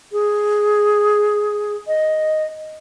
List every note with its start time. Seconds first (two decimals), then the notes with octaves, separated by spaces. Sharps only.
0.12 G#4
1.87 D#5